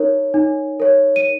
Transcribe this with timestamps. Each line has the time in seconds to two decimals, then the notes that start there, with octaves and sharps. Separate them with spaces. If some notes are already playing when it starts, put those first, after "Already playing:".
Already playing: D#4 A#4 C#5
0.34 D#4
0.80 A#4 C#5
1.16 D#7